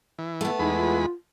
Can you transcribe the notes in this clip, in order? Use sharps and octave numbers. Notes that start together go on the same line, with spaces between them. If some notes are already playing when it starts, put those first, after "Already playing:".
E3
A3 B3
E2 G#3 D#4 B5
F4